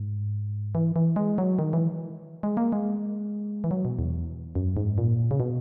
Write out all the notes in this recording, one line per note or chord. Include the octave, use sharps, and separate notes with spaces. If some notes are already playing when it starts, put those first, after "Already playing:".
Already playing: G#2
E3
E3
G#3
F#3
D#3
E3
G#3
A#3
G#3
E3
F#3
B2
E2
F#2
G#2
A#2
C#3
B2